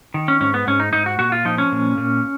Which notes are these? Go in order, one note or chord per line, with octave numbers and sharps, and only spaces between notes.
D#3
C#4
G#2 C#4
B3
G#2 C#4
D#4
G#2 D#4
F#4
A#2 F#4
F4
F3 D#4
C#4
A#2
A#2